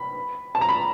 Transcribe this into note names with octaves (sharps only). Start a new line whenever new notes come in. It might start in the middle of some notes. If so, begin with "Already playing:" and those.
Already playing: B5
A5
A#5
B5